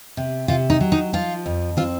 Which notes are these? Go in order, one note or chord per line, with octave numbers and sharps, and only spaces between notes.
C3
C3 F4
D#4
F#3
D#4
F3 F4
F2
C4 F4